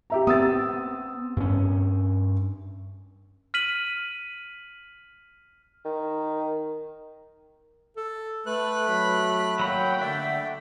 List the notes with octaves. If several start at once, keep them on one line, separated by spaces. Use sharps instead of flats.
G4 E5 A#5
B3 C4 D#6 E6 A6
G2 C#4
F6 B6 D#7 F#7
D#3
A4
A3 B4 F#6
F#3 B5
F#3 A#3 F#5 G5 B5
D3 A3 D5 E5